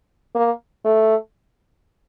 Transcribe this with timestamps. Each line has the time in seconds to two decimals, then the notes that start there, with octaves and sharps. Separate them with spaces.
0.35 A#3
0.85 A3